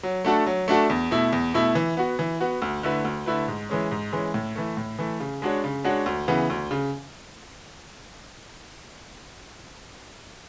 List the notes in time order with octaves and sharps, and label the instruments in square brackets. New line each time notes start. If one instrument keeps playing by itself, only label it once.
[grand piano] F#3
A3 D4 F#4 A4
F#3
A3 D4 F#4 A4
E2
B2 A3 E4
E2
B2 A3 E4
E3
B3 F#4
E3
B3 F#4
D2
D3 A3 E4 B4
D2
D3 A3 E4 B4
G#2
E3 G#3 C#4
G#2
E3 G#3 C#4
A2
E3 A3
A2
E3 A3
C#3
G#3 D4 F#4 C#5
C#3
G#3 D4 F#4 C#5
D2
C#3 E3 B3
D2
C#3